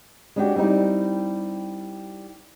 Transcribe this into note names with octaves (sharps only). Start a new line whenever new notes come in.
G#3 C#4 D4 F#4 G4
G3 C4 D#4 E4